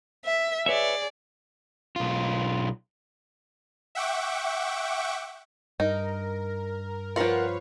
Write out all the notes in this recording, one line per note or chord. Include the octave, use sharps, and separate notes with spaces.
E5
G#4 B4 C#5 D5 E5
B1 F4
E5 F#5 G5 C#6 D6
G2 D#4 A#4
F3 F4 A#4 B4 C#5 F5 F#5